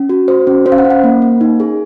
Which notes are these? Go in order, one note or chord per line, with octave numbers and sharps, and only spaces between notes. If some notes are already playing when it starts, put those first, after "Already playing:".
Already playing: C#4
F#4
F#4 C5
C#4
C#4 C5
F5
F#5
C#4
F#5
A#3
A#3
D#4
G#4